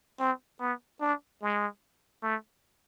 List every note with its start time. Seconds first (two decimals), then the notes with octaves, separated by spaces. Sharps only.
0.19 C4
0.60 B3
1.01 D4
1.42 G#3
2.23 A3